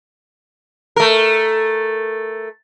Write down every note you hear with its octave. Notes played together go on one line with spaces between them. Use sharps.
A3 A#4